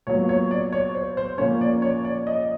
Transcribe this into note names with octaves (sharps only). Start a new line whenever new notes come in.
A#2 F#3 B3 C#5
C#5
D5
C#5
C5
C5
A#2 F3 A#3 C#4 C#5
D5
C#5
D5
D#5